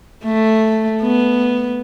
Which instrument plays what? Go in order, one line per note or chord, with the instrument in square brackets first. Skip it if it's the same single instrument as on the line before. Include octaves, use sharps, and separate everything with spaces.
[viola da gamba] A3
B3